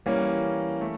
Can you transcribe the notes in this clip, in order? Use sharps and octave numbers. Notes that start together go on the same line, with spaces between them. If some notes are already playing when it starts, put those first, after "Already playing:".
E3 G3 A#3 C#4
A3